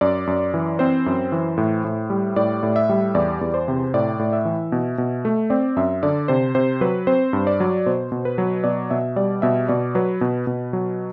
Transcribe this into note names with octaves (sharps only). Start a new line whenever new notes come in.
F#2 D5
F#2
E3
C4 C5
F#2
E3
A2
A2
G3
A2 D5
A2
E5
G3
E2 D5
E2
C5
C3
A2 D5
A2
E5
E3
B2
B2
A3
C4 D5
F#2 E5
D3 D5
C3 C5
C3 C5
F#3 B4
C4 C5
G2
D5
F#3
B2 C5
B2
B4
F#3
B2 D5
B2 E5
G3 D5
B2 E5
B2 D5
F#3 B4
B2
B2
F#3